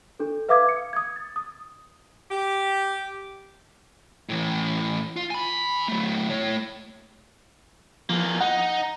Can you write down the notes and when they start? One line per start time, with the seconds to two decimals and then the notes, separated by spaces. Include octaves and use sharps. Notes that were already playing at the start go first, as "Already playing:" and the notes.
0.19 D4 A4
0.49 B4 E5 F5 D6 D#6 G#6
0.69 C#7
0.93 D#6 G#6
1.16 A6
1.36 D#6
2.31 G4
4.29 A2 E3
5.16 F4
5.30 G#5 B5
5.88 F#3 A3
6.29 A3 C#5
8.10 E2 F3 A#3
8.41 D#4 F#5